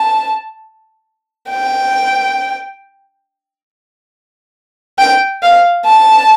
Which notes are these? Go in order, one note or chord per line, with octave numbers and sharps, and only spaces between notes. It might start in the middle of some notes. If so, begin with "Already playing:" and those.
Already playing: A5
G5
G5
F5
A5